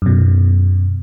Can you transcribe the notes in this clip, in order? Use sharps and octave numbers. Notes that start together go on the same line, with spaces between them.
F#2 B2